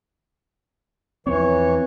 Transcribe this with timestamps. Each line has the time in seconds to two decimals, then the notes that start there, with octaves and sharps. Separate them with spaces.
1.27 E2 E3 F3 C4 C#5